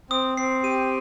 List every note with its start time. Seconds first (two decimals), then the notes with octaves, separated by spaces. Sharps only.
0.10 C4 D#6
0.37 C4 C7
0.64 G4 D#7